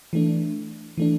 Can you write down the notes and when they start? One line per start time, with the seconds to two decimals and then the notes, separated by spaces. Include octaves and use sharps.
0.13 E3 A3 D4
0.97 E3 A3 D4